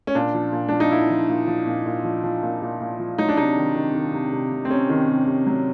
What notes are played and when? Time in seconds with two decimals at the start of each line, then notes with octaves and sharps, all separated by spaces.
0.07 C#4
0.15 A#2 D4
0.34 F3
0.53 A#2
0.68 F3 D4
0.80 D#4
0.91 A#2 E4
1.10 F3
1.29 A#2
1.47 F3
1.67 A#2
1.86 A#2
2.05 F3
2.24 F3
2.43 A#2
2.62 A#2
2.81 A#2
3.00 F3
3.18 F#3 D#4
3.29 D4
3.37 C3 D#4
3.57 D#3
3.76 D#3
3.95 D#3
4.13 C3
4.32 C3
4.52 C3
4.65 C4
4.70 C3 C#4
4.90 D#3
5.08 C3
5.27 C3
5.46 F#3